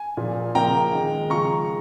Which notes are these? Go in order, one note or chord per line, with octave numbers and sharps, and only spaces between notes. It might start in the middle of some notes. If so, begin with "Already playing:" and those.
Already playing: G#5
A#2 F3 A#3
C#3 F3 A#3 G5 A#5
D#3 G#3
C#3 F3 G#3 A#5 C#6